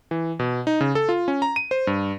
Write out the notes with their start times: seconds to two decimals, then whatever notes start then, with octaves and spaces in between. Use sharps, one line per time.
0.11 E3
0.39 B2
0.67 D#4
0.81 C#3
0.95 A4
1.09 F4
1.28 C#4
1.42 A#5
1.56 D#7
1.71 C5
1.87 G2